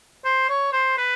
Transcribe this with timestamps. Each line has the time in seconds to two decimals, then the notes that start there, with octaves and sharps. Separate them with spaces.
0.25 C5
0.49 C#5
0.73 C5
0.98 B4